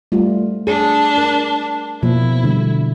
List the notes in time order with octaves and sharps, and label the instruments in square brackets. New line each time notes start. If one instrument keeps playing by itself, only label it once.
[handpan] G3 A3 F4
[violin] D4 [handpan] G#4
[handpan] A#4
[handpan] B2 F3 A#3 [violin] E4
[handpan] D3 G3